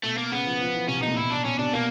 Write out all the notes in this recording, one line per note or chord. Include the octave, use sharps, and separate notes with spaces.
B2 A3
A#3
C#3 B3
F3
F3
E3
C3 C#4
B2
A#2 D#4
B2 E4
D4
B2 C#4
C3 D4
B2 A#3